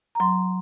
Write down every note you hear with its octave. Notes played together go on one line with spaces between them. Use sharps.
A#5
F#3 C6